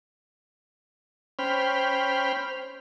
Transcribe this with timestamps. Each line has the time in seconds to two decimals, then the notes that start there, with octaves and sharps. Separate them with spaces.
1.39 C#4 C5 G5 B5 F6